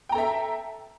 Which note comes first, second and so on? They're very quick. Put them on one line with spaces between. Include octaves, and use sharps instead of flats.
G5 A#5 A4 E5